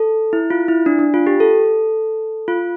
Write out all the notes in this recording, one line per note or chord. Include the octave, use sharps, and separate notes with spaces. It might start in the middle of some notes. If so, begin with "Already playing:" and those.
Already playing: A4
E4
F4
E4
D4
D4
F4
G4
A4
F4